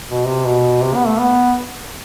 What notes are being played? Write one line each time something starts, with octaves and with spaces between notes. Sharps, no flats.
B2
C3
B2
C3
B3
A3
B3